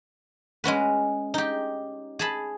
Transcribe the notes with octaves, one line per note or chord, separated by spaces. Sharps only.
G#3 C#4 F#4 B4
D#4 G4
G#4 A5 B5